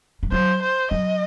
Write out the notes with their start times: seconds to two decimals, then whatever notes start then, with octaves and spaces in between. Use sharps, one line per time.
0.23 G#3
0.32 F#3 C5
0.62 C5
0.91 F#3 D#5